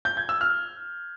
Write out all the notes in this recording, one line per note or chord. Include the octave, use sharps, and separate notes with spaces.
G6
G#6
E6
F6